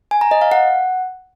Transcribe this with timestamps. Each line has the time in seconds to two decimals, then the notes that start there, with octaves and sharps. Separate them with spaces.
0.11 G#5
0.21 A#5
0.31 D#5
0.41 F5
0.52 F#5